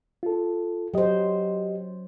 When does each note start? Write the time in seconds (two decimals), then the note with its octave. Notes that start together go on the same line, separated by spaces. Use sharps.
0.23 F4 A4
0.94 F#3 G4 C5 D#5